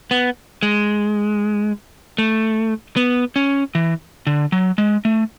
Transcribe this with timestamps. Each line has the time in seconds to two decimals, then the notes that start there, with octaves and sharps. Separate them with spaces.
0.11 B3
0.62 G#3
2.18 A3
2.96 B3
3.36 C#4
3.75 E3
4.27 D3
4.52 F#3
4.78 G#3
5.05 A3